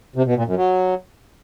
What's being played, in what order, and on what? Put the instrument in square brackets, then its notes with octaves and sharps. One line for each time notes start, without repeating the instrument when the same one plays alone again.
[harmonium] C3
B2
A#2
F#2
F#3